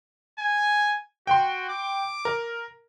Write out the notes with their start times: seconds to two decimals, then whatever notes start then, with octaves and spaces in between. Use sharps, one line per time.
0.39 G#5
1.27 F#4 G5 C6
1.69 D6
2.25 A#4